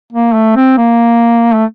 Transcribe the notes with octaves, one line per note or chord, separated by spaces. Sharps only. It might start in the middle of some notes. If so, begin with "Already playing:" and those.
A#3
A3
C4
A#3
A3